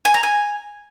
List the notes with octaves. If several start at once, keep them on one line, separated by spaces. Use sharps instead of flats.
G#5
A#5
G#5